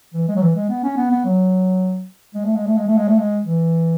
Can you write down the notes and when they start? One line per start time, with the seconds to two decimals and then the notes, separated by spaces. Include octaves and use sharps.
0.14 E3
0.29 G#3
0.36 F#3
0.42 E3
0.56 G#3
0.69 B3
0.84 C#4
0.97 B3
1.11 B3
1.25 F#3
2.35 G#3
2.45 A3
2.56 G#3
2.66 A3
2.77 G#3
2.87 A3
2.97 G#3
3.08 A3
3.18 G#3
3.45 E3